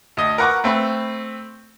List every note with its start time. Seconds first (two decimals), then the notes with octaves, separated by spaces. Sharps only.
0.17 D2 D#5
0.38 A#4 B4 F#5 C#6 D6
0.64 A3 C4 B4